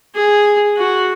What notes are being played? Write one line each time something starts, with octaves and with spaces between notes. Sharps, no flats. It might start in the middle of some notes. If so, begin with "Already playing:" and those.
G#4
F#4